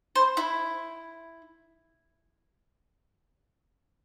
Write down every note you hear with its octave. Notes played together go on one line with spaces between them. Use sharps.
C5
E4